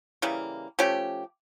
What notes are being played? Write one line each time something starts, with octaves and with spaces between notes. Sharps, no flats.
C#3 E3 G3 A#3
F3 A3 C#4 G4